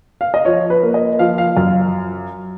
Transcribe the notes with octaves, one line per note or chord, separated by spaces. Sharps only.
F5
D#5
F3 C#5
B4
A#3
D#5
F3 F5
F5
F#2 F5